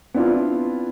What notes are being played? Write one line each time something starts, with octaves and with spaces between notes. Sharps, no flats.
B3 C4 D4 E4 F4